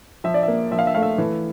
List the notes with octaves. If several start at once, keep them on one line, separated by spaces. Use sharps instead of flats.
F3 E5
D5
E5
A#3
F3 E5
F5
E5
A3 F5
E5
E3